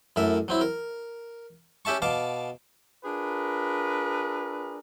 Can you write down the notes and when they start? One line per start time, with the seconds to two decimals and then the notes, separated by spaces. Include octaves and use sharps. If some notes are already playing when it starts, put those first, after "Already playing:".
0.16 F#2 A2 A#4 E5
0.48 F#3 C4 E4
0.61 A#4
1.85 C#4 G4 E5 A5 C#6
2.02 B2 F5 A5 D6
3.05 D4 F4 G#4 A#4 B4